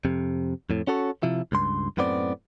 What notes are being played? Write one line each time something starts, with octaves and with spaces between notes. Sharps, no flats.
F2 C3
F2 A2
C#4 F#4 A4 C#5
C3 F3 E4
C#2 G2 C6
F#2 A2 B3 C4 D5